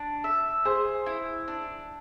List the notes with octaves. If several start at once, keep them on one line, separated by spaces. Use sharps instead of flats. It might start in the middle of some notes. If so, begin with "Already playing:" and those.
Already playing: D4
E5
G#4 C5
E4
D4